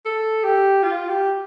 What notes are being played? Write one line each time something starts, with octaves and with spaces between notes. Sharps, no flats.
A4
G4
F4
G4